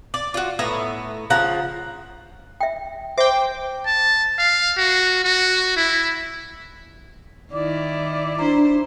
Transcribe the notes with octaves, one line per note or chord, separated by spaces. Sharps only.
D5
F4 F#4
A2 B3 E5 A#5
C#3 F3 F#5 A#5
E5 G5
C5 E5 G5 D6
A5
F5
F#4
F#4
E4
D#3 E4 D5
D4 E4 C5 A#5